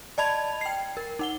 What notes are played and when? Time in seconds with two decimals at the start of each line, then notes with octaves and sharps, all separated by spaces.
0.18 D5 D#5 A5 B5 G#6 F7
0.61 G5 C7
0.97 A#4
1.19 D#4 F#5 G7